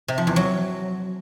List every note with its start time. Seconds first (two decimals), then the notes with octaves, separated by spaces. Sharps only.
0.08 C3
0.18 F3
0.27 E2
0.36 F#3